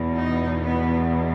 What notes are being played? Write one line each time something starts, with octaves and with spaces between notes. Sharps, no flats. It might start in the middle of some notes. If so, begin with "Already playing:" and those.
Already playing: E2 B2
D#4
B3